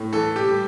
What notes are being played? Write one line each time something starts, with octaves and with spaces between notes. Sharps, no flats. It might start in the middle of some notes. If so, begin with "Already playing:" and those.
Already playing: A2
E3 A4
G4
G3